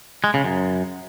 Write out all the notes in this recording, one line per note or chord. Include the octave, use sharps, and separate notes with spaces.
G#3
C#3
F#2